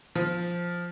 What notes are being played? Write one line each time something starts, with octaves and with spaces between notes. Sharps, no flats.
F3